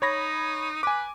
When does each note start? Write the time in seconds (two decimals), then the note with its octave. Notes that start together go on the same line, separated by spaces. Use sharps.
0.02 D#4 C#5 B5 A#6
0.83 B4 G#5 D6